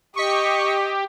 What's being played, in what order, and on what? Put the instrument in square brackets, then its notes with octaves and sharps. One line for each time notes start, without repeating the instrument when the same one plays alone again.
[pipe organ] G4 [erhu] D#5 [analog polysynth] C#6 B6 C#7